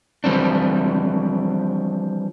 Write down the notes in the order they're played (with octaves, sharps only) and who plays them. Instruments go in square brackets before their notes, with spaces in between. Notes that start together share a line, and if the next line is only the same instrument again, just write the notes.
[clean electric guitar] E3 F3 G3 C4 D4